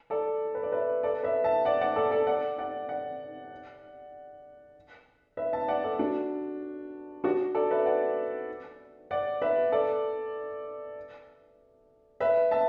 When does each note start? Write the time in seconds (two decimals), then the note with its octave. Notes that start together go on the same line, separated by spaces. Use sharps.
0.10 A4 D5
0.55 B4
0.63 D5
0.72 B4 E5
1.03 A4 D5
1.23 B4 E5
1.44 E5 A5
1.65 D5 F#5
1.81 D5 F#5
1.96 A4 D5
2.11 A4 D5
2.27 D5 F#5
2.58 D5 F#5
2.89 D5 F#5
5.37 B4 E5
5.53 E5 A5
5.68 D5 F#5
5.84 A4 D5
5.99 D4 F#4
7.24 D4 F#4
7.55 A4 D5
7.71 B4 E5
7.86 D5 F#5
9.11 D5 F#5
9.42 B4 E5
9.72 A4 D5
12.20 B4 E5
12.51 E5 A5